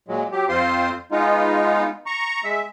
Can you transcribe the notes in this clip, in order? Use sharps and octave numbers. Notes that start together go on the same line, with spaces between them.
A#2 F#3 G#3
F#3 G4
F2 C4 F4 C5 C6
G#3 B3 D#4 F4
A#5 C#6
G#3 E5